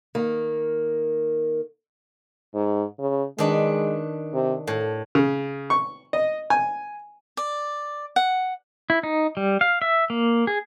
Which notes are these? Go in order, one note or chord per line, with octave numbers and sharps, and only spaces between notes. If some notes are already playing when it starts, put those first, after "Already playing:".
D#3 A#3
G#2
C#3
D#3 G#3 D4 B4
C3
A2 A4
C#3
C#6
D#5
G#5
D5
F#5
E4
D#4
G3
F5
E5
A#3
G#4